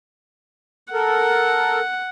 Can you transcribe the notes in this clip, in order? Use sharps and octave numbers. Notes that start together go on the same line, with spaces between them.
A4 A#4 F#5